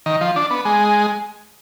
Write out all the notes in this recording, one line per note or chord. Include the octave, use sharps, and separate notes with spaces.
D#3
F3
D4
B3
G#3